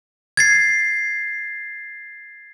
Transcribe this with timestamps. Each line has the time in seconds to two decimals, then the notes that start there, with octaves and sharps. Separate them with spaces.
0.37 G#6 A6 C7